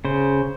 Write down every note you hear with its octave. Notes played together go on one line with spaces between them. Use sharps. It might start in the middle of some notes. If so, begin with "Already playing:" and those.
C#3 C5